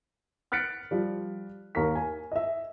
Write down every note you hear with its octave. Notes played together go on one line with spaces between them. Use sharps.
F6 F#6 A6 B6 C#7 D7
F3 G3
D#2 A#4 C#6 B6
G#5
D#5 E5